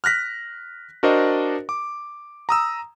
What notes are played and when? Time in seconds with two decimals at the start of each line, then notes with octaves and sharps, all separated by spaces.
0.04 F6 F#6 A#6 B6
1.03 D4 F#4 A#4 C5 D5 D#5
1.69 D6
2.49 A#5 D#6 E6